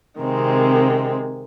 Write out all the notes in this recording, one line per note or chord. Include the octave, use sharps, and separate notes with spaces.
C3 D#3 G#3 C4